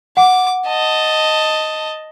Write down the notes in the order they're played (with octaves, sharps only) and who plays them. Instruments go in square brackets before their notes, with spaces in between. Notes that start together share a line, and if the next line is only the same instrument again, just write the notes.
[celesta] F#5 [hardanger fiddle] D6
[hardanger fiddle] D#5 A5